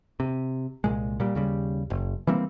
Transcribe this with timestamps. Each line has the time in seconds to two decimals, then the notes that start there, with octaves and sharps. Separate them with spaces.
0.20 C3
0.84 C2 A#2 G#3
1.20 A#2 G3
1.35 D#2 C#3 G3
1.90 F#1
2.27 E3 G3 A#3 C4